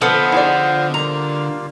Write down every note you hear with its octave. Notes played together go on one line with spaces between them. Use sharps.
D3 F3 B3 A4 C5 D#5 F5
E4 G#4 D5
G3 A#3 F4 A#5